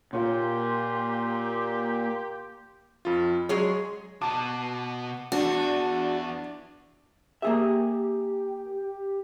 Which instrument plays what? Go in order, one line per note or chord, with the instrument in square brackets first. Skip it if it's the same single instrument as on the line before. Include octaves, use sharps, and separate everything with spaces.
[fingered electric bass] A#2 [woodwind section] A#3 G4 [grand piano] F4 C#5 [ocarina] C6
[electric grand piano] F2 F4
[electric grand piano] F#3 [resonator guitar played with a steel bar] G#3 G#4 C#5
[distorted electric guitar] B2 F#4 [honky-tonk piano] A5 D6
[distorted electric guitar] E2 [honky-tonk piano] D4 [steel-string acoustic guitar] F#4
[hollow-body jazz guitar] A#3 G#4 E5 [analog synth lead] G4